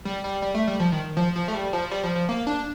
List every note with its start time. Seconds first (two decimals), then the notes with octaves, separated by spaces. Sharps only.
0.05 G3
0.24 G3
0.42 G3
0.54 A3
0.67 G3
0.80 F3
0.92 D#3
1.17 F3
1.36 F3
1.48 A3
1.54 G3
1.73 F3
1.91 G3
2.03 F3
2.16 F3
2.29 A#3
2.47 D4